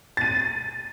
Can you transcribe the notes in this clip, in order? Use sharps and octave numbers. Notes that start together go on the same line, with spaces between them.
A6 D#7